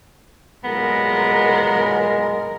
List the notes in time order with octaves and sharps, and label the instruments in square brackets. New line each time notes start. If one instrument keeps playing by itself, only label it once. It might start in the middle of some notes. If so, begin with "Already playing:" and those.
[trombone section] B1 A#2 G#3 [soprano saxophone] B3 [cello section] A#4